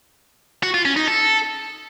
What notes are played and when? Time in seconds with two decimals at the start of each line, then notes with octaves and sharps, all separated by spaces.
0.63 F#4
0.74 F4
0.85 C#4
0.96 D#4
1.07 A4